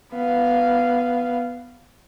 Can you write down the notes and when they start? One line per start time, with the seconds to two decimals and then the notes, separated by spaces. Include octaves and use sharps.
0.13 B3 F5